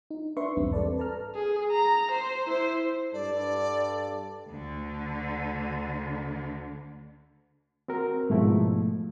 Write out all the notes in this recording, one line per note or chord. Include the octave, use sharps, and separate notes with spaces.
D#4
D4 B4 E5 C6 C#6
B1 E2 G#2 G3 C4
A4 B4 D5 A5
A4 B4 A5 A#5 F6
G#4
A#5
C5
E4 C5
G2 A4 D5
D2 D3
C4 F#4 A#4
G#2 B2 F3 A3 E4